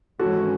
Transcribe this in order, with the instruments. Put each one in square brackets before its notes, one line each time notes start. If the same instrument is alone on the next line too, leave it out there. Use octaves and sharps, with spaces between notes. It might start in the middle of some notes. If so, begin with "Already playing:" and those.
[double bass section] G#1 G#2 E3 G#3 C#4 [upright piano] F#4 A4